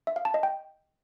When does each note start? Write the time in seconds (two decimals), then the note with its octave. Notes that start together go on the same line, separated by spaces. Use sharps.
0.07 E5
0.16 F5
0.25 A5
0.34 D#5
0.43 G5